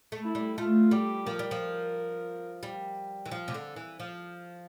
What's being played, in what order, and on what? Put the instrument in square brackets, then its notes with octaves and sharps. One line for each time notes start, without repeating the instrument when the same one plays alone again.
[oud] A3
[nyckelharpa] E4
[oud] G3
[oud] A3 [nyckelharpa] F4
[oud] G3 [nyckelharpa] G4
[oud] F3 [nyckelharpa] A#4
[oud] G3
F3
G3
E3
F3
C3
D3
E3
F3